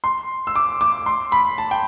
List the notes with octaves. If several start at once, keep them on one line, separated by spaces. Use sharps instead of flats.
C6
E6
D6
D6
C6
B5
A5
G5